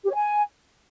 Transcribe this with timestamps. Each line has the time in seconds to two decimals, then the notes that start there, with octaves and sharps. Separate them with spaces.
0.05 G4
0.10 C#5
0.15 G#5